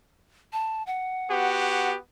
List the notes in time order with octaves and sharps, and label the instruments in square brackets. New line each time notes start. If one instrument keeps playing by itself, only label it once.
[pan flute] A5
F#5
[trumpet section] B3 F#4 G4